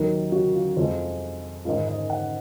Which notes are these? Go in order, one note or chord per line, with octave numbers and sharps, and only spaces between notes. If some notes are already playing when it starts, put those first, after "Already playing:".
Already playing: D#2 D#3 F#3
F#4
F4
F2 F3 G#3 F4
G#2 D#3 G#3 F4
D#5
F#5